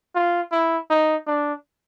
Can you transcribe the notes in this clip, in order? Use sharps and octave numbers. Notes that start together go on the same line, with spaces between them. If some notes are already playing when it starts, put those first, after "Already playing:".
F4
E4
D#4
D4